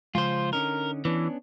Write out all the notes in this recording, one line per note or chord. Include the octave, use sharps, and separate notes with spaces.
C#3 F3 G#3 F4 C5
D3 C#4 D#4 A#4
E3 B3 C#4 D4